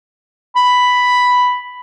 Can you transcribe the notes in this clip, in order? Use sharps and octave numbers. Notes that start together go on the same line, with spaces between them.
B5